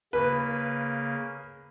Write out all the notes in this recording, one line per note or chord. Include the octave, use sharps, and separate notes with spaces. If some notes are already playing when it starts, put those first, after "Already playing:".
C#3 A#3 B4